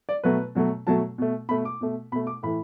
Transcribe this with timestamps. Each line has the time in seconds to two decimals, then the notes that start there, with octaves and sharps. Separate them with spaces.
0.09 D5
0.24 B2 F#3 A3 B4
0.55 B2 F#3 A3
0.87 B2 F#3 A3 A5
1.18 B2 A3
1.49 B2 A3 B5
1.65 D6
1.81 B2 A3
2.12 B2 B5
2.16 A3
2.27 D6
2.43 A2 E3 A3 B5